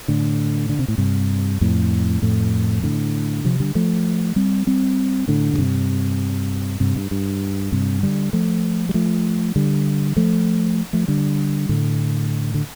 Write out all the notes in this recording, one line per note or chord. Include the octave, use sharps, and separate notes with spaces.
A2 D3
D3
C3
A2
G2 C3
F2 A2
F2 A2
A2 D3
C3 F3
D3 G3
F3 A3
G3 C4
G3 C4
A2 D3
A2
G2 C3
G2 C3
G2
G2
G2 C3
D3 G3
F3 A3
G3
F3 A3
D3 G3
F3 A3
F3 A3
D3 G3
A2 D3
D3